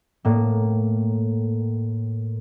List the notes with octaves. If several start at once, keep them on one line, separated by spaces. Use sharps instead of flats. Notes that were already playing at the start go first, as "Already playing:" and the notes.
A2 A#3